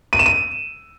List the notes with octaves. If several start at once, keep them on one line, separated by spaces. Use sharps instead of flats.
D#7
E7
D#7